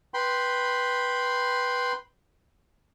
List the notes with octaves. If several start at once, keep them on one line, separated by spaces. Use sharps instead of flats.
B4 G5 B5 C6